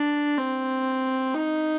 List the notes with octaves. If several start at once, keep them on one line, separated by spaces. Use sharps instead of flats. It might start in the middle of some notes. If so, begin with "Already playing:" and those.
Already playing: D4
C4
D#4